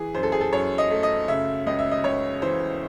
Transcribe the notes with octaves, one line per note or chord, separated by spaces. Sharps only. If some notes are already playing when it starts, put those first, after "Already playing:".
Already playing: E3 G#4
F#2 C5
A4
G#4
A4
F#2 C#5
D#5
A3
D#5
C#3 E5
C#2 D#5
E5
D#5
C#2 C#5
E3 C5